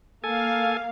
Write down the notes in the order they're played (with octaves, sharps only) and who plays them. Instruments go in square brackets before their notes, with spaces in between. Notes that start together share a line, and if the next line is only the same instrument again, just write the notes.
[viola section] A#3 F5 [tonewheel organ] A4 G#5